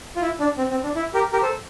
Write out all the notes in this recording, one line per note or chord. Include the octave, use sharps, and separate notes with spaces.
F4
E4
D4
C4
C4
D4
E4
G4 A#4
G4 A#4
A4 C5